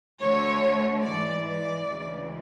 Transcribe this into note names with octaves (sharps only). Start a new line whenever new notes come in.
D2 D3 A3 C#5
G#2 E3 G#3 D5
D5
D2 C#3 E3 G#3